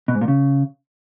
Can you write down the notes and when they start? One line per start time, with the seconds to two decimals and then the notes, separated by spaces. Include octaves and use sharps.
0.08 B2
0.15 G#2
0.21 A#2
0.28 C#3